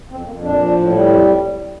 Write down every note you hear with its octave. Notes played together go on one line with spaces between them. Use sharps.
F2 C4
F2 A#3
A#2 D4
F3
A2
G3
F2